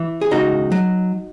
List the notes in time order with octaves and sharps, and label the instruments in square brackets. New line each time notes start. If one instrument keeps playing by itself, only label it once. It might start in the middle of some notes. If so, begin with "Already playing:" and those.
Already playing: [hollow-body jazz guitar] E3
G#4
C#2 D#4 F#4
F#3